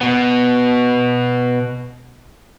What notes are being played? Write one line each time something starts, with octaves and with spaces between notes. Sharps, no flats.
B2 B3